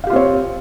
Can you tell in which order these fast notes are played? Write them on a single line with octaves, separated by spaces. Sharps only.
F5 G4 F4 C4 C#5